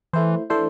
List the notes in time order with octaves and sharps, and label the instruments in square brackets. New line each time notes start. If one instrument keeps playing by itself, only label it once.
[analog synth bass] E3 [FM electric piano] A3 E4 C5
[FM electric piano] E3 A3 D4 A4 C5